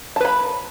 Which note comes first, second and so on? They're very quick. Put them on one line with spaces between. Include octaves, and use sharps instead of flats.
A5 B4 B5